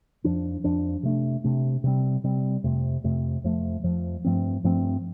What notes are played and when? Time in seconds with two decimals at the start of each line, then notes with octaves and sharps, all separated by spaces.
0.24 F2 F3 D4
0.64 F2 F3 D4
1.03 C3 A3 D4
1.44 C3 A3 D4
1.84 C3 G3 C4
2.24 C3 G3 C4
2.64 F2 C3 A3
3.04 F2 C3 A3
3.44 F2 F3 A3
3.83 F2 F3 A3
4.24 G2 F3 A3 C4
4.64 G2 F3 A3 C4